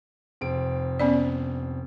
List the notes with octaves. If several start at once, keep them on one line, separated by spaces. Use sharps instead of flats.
F1 C4 D7
B3 C#4 D5